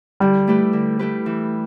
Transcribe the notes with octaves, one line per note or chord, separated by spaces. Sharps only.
D3 G3
A3 E4 G4 B4
D3
A3 E4 G4 B4
E3